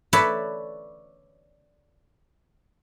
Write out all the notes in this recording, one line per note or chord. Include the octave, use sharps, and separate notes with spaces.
A4 B4 C#5 D5 E5 B5